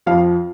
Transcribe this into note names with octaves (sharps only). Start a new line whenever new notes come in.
F2 F3 F5